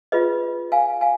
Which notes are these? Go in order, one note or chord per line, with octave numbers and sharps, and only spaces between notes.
F4 G#4 B4 D#5
F5 G#5
F5 G#5